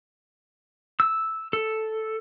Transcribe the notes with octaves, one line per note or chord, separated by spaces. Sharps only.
E6
A4